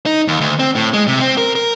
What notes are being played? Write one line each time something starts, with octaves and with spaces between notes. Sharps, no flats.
D#4
D#2
D2
C4
A2
G#3
C3
C4
A#4
A#4